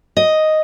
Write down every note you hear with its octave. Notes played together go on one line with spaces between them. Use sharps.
D#5